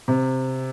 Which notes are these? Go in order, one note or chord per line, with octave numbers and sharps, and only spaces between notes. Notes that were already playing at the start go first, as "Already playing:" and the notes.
C3